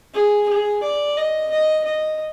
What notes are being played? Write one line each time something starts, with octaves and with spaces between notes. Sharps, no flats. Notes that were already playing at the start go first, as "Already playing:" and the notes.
G#4
G#4
D5
D#5
D#5
D#5